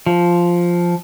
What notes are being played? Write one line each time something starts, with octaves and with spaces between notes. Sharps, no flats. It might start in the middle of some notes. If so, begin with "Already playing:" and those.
F3